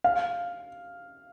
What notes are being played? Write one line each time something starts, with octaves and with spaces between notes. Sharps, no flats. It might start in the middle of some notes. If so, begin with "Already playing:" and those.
F5